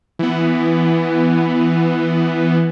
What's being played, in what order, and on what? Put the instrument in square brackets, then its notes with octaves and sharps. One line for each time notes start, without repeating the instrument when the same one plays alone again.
[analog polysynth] E3 B3